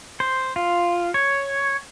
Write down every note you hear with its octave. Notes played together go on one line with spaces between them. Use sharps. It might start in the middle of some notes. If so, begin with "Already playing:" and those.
C5
F4
C#5